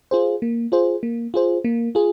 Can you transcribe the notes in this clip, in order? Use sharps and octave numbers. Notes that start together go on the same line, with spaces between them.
F4 G#4 C5
A#3
F4 G#4 C5
A#3
F4 G#4 C5
A#3
F4 G#4